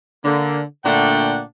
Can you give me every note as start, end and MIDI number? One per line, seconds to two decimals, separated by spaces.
0.24 0.60 50
0.24 0.60 58
0.84 1.42 46
0.84 1.42 50
0.84 1.42 57
0.84 1.42 62
0.84 1.42 78
0.84 1.42 79